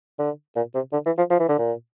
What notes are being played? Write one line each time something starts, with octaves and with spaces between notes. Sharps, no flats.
D3
A#2
C3
D3
E3
F3
F3
E3
D3
A#2